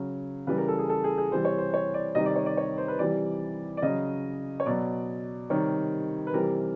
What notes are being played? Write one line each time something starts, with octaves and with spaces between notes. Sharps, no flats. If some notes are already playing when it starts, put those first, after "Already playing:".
Already playing: C#3 F#3
C#3 E3 G3 B4
A#4
A4
G#4
A4
G#4
G#4
C3 E3 G3 C5
C#5
C5
C#5
D5
C3 D#3 G3 D#5
D5
C#5
D5
C#5
C5
B4
C3 E3 G3 D5
D5
C#3 F#3 D#5
C#5
B2 F#3 D5
C3 D#3 G3 C#5
B4
C3 E3 G3 A#4